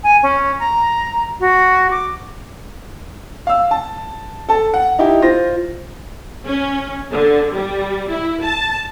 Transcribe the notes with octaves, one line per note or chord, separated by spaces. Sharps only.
G#5
C#4
A#5
F#4
D6
F5 E6
A5
A4 A5
F#5
D#4 E4 G4
F4 C5 A#6
C#4
D3
G3
E4
A5